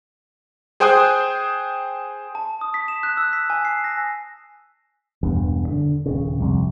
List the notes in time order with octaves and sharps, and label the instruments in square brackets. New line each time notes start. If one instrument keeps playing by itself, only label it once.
[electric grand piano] G#4 C5 G5 G#5 D#6 F#6
[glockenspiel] A5
D#6
B6
E7
F#6
E6
B6
G#5
C7
A#6
[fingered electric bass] E1 E2 G2
D3
D#1 C#3
C2 F2